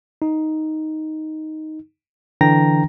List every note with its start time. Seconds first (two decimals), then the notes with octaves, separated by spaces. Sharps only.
0.22 D#4
2.41 D3 E3 D4 G5 A#5 A#6